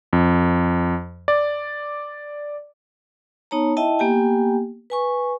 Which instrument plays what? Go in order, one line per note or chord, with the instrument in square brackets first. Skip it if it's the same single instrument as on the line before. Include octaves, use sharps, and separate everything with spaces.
[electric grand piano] F2
D5
[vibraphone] B3 D#4 C#5 A5 A#5
E4 D#5 E5 G5 A5
A#3 B3 G4 G5 G#5
B4 G#5 C#6